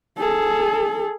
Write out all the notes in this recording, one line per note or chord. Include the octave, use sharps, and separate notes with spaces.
G#4 A4